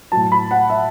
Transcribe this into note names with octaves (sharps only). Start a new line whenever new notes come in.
A2 F#3 A5
B5
F#5
E5